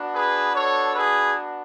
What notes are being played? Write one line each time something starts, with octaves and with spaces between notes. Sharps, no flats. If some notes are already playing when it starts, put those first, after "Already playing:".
Already playing: B3 D4 F#4
G#4 B4
A4 C#5
G#4 B4